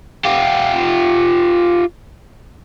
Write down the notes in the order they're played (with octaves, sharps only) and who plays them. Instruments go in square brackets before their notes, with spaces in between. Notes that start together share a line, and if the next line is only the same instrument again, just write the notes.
[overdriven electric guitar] F4 G4